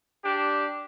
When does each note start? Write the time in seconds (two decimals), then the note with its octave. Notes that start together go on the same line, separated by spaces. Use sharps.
0.25 D4 G4